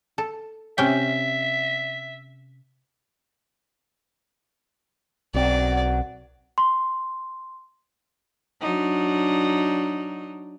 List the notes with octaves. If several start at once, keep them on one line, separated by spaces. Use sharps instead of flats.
A4
C3 C#4 E5 G5
B1 F#2 F#3 C4 D5
C6
F#3 D4 D#4